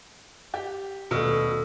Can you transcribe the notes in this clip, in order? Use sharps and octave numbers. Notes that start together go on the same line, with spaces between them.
G4 A6
D#1 B2 A3 E6 F6